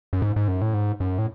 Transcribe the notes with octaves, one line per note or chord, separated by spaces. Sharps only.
F#2
G#2
G#2
F#2
A2
G#2
F#2
A2